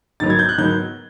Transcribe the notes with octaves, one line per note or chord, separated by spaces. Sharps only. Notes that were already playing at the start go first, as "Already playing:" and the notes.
G#2 D#3 F#3 B3 A6
G#6
G6
F#6
G#2 D#3 F#3 B3 G6